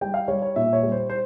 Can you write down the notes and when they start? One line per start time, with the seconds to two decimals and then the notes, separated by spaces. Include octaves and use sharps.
0.01 G3 G5
0.14 F5
0.28 G3 C#5
0.42 C#5
0.56 A#2 E5
0.73 C#5
0.83 G3
0.92 C5
1.10 C5